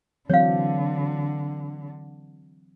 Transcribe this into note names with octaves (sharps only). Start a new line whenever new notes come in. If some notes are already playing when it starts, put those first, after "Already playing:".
D3 E3 F#3 C4 C#5 F5